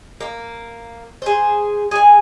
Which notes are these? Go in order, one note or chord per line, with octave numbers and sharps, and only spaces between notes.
A#3
G#4 C5
G#4 G#5